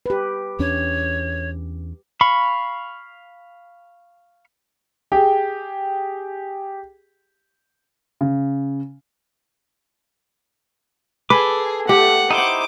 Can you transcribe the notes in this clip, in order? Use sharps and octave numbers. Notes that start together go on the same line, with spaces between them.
G4 B4
E2 C#4 D4 C#5
F5 B5 C#6
G4 G#4 G5
C#3
G#4 A4 B4 D6
A3 G4 F#5
D#4 E4 C5 D6